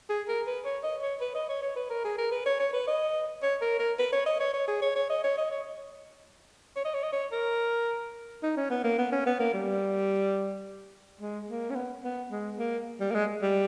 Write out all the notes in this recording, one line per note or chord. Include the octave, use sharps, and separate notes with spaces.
G#4
A#4
B4
C#5
D#5
C#5
B4
D#5
C#5
C#5
B4
A#4
G#4
A#4
B4
C#5
C#5
B4
D#5
C#5
A#4
A#4
B4
C#5
D#5
C#5
C#5
G#4
C#5
C#5
D#5
C#5
D#5
C#5
C#5
D#5
C#5
D#5
C#5
A#4
D#4
C#4
B3
A#3
B3
C#4
B3
A#3
G3
G#3
A#3
C#4
B3
B3
G#3
A#3
G3
A#3
G#3
G3